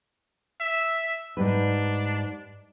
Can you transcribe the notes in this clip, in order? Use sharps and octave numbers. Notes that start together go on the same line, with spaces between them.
E5
G#2 G3 D4 B4